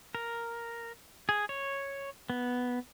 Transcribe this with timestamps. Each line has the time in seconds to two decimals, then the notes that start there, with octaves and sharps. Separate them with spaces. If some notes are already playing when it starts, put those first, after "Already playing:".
0.15 A#4
1.29 G#4
1.49 C#5
2.30 B3